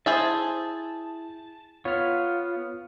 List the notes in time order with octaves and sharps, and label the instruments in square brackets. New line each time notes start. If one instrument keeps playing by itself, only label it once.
[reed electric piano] E4 [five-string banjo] G#4 C5 E5 [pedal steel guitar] A5
[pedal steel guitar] B3 F4 [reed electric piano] C#5 F6